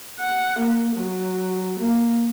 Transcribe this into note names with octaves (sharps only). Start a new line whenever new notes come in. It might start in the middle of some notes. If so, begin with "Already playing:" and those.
F#5
A#3
F#3
A#3